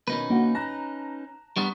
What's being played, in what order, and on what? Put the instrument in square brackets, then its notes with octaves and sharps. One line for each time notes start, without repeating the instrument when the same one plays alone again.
[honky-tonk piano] B2 D#3 [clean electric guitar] C#4 D#4 B4
[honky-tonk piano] D3 F#4 [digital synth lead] A#3
[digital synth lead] A5 [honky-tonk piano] A#5 F#6 A#6
[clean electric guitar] G3 B3 D4 [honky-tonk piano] A#5 D#6 B6 [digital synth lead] C#6